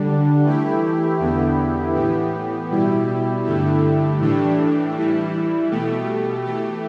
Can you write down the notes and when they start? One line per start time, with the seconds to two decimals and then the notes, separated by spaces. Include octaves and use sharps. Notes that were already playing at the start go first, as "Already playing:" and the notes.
Already playing: D3 G3 D4
0.44 E3 A3 E4 G4
1.19 E2 D3 B3 E4 G4
1.95 A2 E3 B3 G4
2.70 B2 G3 E4 G4
3.45 G2 D3 A3 E4 G4
4.20 A2 E3 A3 D4 G4
4.95 E3 G3 E4
5.70 B2 A3 G4
6.45 E3 A3 G4